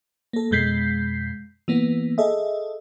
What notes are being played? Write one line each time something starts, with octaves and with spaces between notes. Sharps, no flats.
A#3 A4
F2 B2 G#3 G6 B6 C7
E3 A#3 B3
G#4 A4 D#5 E5